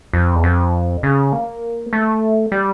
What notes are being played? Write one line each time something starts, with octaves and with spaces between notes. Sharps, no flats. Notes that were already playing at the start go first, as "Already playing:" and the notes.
F2
E2
F2
C#3
A#3
A3
G3